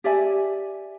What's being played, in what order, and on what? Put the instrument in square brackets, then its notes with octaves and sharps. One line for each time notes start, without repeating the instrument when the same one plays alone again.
[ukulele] G4 D5 E5 G#5